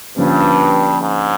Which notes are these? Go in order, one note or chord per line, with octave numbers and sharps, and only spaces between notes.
G2 D3 F3 A#3 C#4
G#2